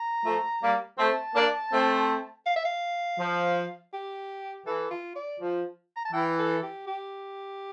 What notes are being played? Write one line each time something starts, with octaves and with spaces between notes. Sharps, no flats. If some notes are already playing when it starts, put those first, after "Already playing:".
Already playing: A#5
F3 A3
G3 A#3
A3 C4 A5
A#3 D4
A3 C4
F5
E5
F5
F3
G4
E3 A4
F4
D5
F3
A#5
A5
E3 G5
A4
G4
G4